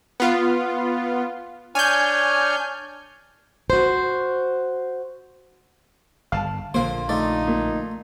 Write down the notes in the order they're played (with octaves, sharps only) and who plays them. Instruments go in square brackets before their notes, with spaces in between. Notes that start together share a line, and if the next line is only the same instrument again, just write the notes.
[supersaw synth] B3 F4
[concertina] D4 C#5 F6 [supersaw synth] G#5 G6
[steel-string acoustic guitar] F#4 C5
[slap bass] G1 [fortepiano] F5 A5
[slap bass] A#1 D3 A#3 [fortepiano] A#2 [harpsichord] C5 F5
[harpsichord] A3 F4 D5 [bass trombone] D#4
[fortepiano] A#2